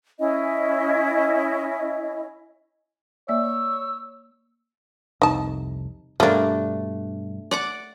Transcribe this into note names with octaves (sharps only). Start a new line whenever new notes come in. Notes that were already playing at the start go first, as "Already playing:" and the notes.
C#4 E4 D#5
A#3 C#5 D5 E5 E6
C2 F2 C3 D#4 A5
G2 B2 G3 A3 A#3 D4
D5 F#5 D6